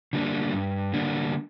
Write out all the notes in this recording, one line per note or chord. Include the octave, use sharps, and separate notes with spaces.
D3 G3 A#3 D4
G2
D3 G3 A#3 D4